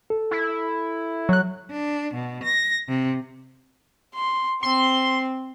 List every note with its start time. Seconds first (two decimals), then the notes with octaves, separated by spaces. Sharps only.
0.10 A4
0.31 E4
1.29 F#3 F#6
1.71 D4
2.14 B2
2.44 A#6
2.88 C3
4.15 C6
4.63 C4 C6